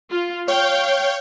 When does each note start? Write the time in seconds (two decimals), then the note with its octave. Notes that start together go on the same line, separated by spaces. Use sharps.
0.11 F4
0.48 C#5 F5 G5 G6